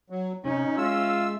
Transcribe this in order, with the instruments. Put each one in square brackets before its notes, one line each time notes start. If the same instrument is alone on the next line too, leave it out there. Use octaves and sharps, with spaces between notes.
[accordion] F#3
[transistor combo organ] C3 [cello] C#4 [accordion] D#4
[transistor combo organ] G#3 E5 [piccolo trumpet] F4 [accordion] E6